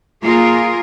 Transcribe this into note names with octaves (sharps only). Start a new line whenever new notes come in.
A#3 F4 G#4 A#4